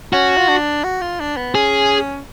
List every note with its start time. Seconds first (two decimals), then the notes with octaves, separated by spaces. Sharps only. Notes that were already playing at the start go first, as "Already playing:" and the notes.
0.13 C#4 F#4
0.37 F4
0.48 D4
0.84 F#4
1.01 F4
1.20 D4
1.37 B3
1.55 C#4 G#4